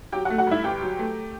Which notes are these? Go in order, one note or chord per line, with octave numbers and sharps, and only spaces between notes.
F#3 G4 G5
F#4 F#5
A3
F#4 F#5
G2 E4 E5
G1 G4 G5
F#3
A3